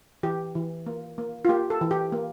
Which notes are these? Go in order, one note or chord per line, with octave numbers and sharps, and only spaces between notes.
E3 G4
E3
A#3
A#3
F4
A#3 G4
A4
E3
G4
A#3